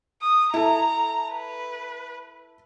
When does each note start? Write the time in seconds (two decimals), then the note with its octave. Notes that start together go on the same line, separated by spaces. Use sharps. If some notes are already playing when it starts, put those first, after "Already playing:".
0.22 D#6
0.54 E4 A4 A#5
1.34 B4